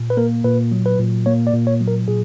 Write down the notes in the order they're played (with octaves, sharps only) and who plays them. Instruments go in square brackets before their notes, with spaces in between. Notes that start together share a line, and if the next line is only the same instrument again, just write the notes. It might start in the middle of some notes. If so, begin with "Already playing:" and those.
Already playing: [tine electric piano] A#2
B4
A#3 A#4
A#2 B4
F#3
B4
A#2
A#3 C#5
D5
A#2
C#5
F#3
A#4
A#2 G#4